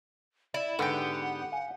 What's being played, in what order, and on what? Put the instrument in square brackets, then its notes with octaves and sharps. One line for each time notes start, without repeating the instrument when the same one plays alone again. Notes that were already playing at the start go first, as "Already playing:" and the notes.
[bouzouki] E4 [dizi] D5
[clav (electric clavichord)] G#2 D3 [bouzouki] B3 G4 [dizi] F#5
[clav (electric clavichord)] F5 G#5